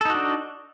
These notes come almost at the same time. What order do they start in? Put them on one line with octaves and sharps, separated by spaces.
A4 D#4 F#4 D4